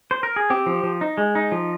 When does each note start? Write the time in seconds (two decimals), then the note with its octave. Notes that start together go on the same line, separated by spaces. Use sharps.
0.11 C5
0.23 A#4
0.36 G#4
0.50 C4 G4
0.66 F3
0.83 F3
1.01 D#4
1.18 G#3
1.35 D#4
1.52 F3